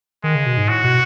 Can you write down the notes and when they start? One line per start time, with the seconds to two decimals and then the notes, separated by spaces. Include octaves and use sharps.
0.24 D#3 G#3
0.35 C#3
0.46 B2
0.58 G#2
0.69 A2 F#4
0.84 B2